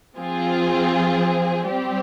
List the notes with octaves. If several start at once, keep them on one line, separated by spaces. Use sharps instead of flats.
F3 C4 F4 G#4
G3 C4 G4